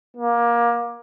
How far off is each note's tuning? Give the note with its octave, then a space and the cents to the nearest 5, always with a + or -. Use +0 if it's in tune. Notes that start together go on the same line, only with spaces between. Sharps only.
A#3 +20